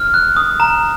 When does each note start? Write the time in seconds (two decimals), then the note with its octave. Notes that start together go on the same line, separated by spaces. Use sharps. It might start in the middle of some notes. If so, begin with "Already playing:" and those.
Already playing: F6
0.14 F#6
0.37 D#6
0.60 A#5